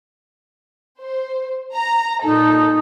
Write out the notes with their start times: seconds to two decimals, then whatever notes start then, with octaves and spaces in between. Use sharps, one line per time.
1.01 C5
1.75 A#5
2.24 A#2 D#4 A4